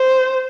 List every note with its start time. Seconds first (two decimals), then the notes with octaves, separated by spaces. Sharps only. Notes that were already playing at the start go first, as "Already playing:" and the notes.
Already playing: C5